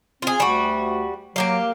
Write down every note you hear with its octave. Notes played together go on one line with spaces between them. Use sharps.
C4 F4 G#4
D2 G3 F#4
F#3 A#3 G4 F5